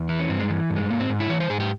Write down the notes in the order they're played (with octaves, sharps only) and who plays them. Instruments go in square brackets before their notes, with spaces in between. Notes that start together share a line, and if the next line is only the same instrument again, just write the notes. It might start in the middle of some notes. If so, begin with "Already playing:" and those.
Already playing: [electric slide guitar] E2
E3 E4
C#4
G2 C4
G#3
E3
G2
G#3
G#2 A#3
C4
G#2
E4
E3 C#5
C5
G#2 G#4
G4